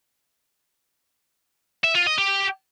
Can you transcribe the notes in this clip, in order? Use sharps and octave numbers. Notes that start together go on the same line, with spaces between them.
E5
F4
D#5
G4